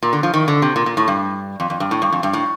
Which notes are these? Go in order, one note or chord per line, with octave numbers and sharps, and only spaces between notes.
A#2
D3
F3
D#3
D3
C3
A#2
A#2
A2
G2
F2
F2
G2
A2
G2
F2
G2
A2